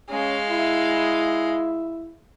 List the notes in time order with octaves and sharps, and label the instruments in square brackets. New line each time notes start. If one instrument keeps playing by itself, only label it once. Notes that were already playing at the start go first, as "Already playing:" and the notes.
[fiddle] G#3 F5 [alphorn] C#4
[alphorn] E4